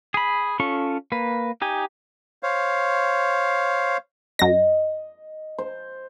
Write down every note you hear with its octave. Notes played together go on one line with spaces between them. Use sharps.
G#4 B5
C#4 F4 A4 C#6
A#3 B4
D#4 G4 G#5
C5 C#5 F5
F#2 D#5 A#6
C5